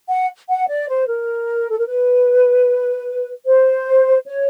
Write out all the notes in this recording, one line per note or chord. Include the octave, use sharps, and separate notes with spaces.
F#5
F#5
D5
C5
A#4
A4
A#4
B4
C5
C#5